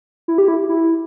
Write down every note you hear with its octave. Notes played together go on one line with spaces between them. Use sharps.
E4
G4
E4
E4